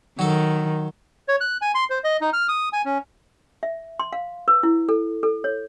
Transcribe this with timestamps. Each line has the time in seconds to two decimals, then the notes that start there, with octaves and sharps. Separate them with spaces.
0.19 D#3 F#3 A4
1.28 C#5
1.41 F#6
1.62 G#5
1.75 C6
1.90 C5
2.04 D#5
2.21 D#4
2.33 F6
2.48 D#6
2.73 G#5
2.85 C#4
3.63 E5
4.00 C6
4.13 F5
4.48 B4
4.63 E4
4.89 A4
5.23 A4
5.44 C#5